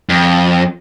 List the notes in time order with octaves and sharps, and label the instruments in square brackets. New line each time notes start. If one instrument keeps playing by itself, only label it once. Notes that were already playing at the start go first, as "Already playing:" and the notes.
[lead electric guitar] F2